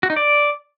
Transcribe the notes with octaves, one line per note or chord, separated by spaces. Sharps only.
F#4
D#4
D5